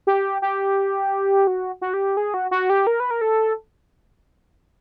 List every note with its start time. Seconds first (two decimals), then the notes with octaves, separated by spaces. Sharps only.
0.07 G4
0.42 G4
1.47 F#4
1.81 F#4
1.94 G4
2.17 G#4
2.34 F#4
2.51 F#4
2.70 G4
2.87 A#4
3.00 B4
3.11 A#4
3.21 A4